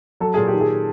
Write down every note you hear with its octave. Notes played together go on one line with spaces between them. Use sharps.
F#3 A4
A#2 G#4
G4
D#3
G#4